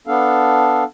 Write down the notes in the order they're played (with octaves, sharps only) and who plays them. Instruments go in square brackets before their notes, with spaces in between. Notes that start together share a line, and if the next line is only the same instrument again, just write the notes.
[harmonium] B3 D4 A4 F5